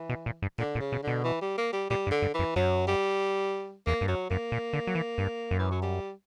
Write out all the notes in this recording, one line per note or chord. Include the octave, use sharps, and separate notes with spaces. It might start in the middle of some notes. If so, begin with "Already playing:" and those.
Already playing: E3
B2
A#2
G2
A#2 D3
A#2
C#3
B2
B2 D3
E3
G3
A#3
G3
A#2 G3
G2
D3
G2
E3
F#2
F#2 F#3
G3
E2 A#3
G2
F#2 F#3
F#2 A#3
A#2
D3
F#3
E3
G2
F#2
E3
F#3
G3